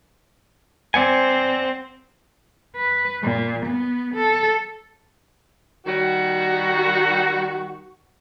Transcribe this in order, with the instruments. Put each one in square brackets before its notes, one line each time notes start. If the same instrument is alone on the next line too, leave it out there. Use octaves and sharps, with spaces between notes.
[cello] C4 [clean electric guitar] D5 F#5 G#5
[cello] B4
A#2
B3
A4
[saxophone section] D#3 G3 F#4